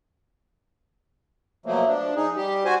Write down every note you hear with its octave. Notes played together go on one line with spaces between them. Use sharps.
B2 F3 F#3 A3 A#3
F3 D4
D#4 G#4
G3 G4
F#4 C5 G#5